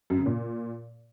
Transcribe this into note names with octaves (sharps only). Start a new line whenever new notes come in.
F#2
C#3
A#2